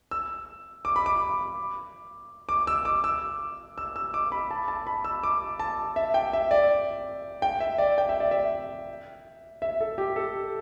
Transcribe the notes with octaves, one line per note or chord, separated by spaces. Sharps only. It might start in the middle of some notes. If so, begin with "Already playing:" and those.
E6
D6
B5
D6
D6
E6
D6
E6
E6
E6
D6
B5
A5
A5
B5
E6
D6
A5
E5
G5
E5
D5
G5
E5
D5
G5
E5
D5
E5
E5
A4
G4
A4